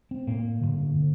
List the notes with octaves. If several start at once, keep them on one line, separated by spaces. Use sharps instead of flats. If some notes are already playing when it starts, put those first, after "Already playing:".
C4
A2 A#3
G2 D3
D3